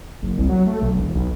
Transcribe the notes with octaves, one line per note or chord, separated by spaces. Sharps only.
F#1
C2
F#3
A3
B1
E1
B1